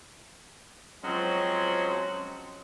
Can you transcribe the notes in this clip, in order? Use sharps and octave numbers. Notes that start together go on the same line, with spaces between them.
F3 F#3 G#3 C4 C#4 F#4